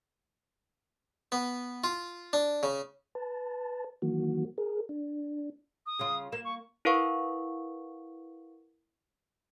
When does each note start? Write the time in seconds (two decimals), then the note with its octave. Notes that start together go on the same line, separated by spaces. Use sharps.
1.32 B3
1.84 F4
2.33 D4
2.63 C#3
3.15 B4 A5
4.02 D#3 E3 F#3 A#3 F#4
4.58 G#4 A#4
4.89 D4
5.86 D#6
5.99 C#3 F4
6.32 A#3 E7
6.45 C#6
6.85 E4 A#4 B4 F5 F#5 C#6